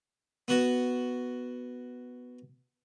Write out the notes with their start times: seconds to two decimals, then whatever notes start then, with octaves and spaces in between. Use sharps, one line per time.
0.48 B3 F#4